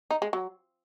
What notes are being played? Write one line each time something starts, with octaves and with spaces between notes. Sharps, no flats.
D#4
G#3
F#3